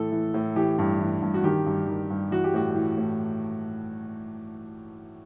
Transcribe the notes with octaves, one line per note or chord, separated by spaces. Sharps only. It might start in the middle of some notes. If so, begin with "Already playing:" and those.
Already playing: A2 E3 A4
E3
A2
E3 G4
G2
E3
G2
F#4
D#3 G4
G2
D#3
G2
E3 F#4
G4
A2 F#4
E3
A2